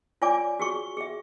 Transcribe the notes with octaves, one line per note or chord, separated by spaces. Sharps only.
F4 C#5 D5 G#5 D6
F#4 G#4 C#6
G#4 E5